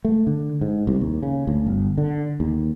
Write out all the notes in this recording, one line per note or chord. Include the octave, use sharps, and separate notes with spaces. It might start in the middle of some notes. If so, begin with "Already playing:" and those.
A3
D3
G#2
C2
D#2
C#3
D2
G1
D3
D#2